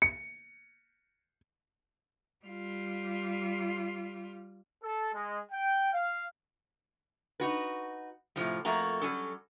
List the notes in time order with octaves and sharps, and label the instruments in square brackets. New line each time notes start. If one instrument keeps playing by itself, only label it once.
[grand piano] C#7
[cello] G3 F4
[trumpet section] A4
G#3
G5
F5
[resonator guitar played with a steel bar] D#4 F#4 B4
A2 C3 F3 G3
F2 A3 A#3 F#4 A#5
F#3 G3 C#4 A4